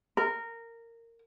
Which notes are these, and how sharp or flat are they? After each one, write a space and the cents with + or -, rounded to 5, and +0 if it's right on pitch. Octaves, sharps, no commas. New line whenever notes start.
A#4 -15